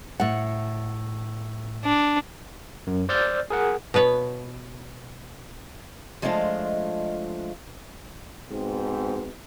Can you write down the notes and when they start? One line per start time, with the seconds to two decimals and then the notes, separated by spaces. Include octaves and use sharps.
0.20 A2 F#5
1.85 D4
2.87 F#2
3.09 C5 D5 E6 F6 G6 A6
3.50 G#4 A#4 F#5
3.94 B2 B3 B4 C#5
6.22 F3 G#3 A3 D4 F4 D#5
8.50 G#2 B2 C4